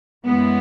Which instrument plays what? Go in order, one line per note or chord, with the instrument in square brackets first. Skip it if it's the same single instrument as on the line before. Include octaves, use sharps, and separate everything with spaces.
[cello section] F#2 E3 G#3 B3